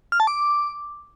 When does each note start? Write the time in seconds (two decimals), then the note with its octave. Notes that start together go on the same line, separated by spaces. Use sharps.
0.12 F6
0.20 A5
0.27 D6